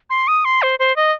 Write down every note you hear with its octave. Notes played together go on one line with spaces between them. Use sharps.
C6
D#6
C6
C5
C5
D#5